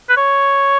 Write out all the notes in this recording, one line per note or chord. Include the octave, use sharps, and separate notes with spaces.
B4
C#5